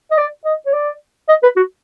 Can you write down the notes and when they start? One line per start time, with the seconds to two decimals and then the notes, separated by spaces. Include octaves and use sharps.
0.11 D#5
0.18 D5
0.45 D#5
0.66 C#5
0.73 D5
1.28 D#5
1.43 B4
1.56 F#4